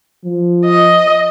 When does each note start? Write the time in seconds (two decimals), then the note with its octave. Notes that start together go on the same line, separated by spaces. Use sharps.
0.25 F3
0.66 D#5